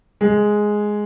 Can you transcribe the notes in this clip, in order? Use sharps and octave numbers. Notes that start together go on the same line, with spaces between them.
G#3